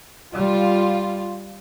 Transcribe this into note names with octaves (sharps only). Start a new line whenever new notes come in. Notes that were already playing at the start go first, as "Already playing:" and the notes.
G3 F4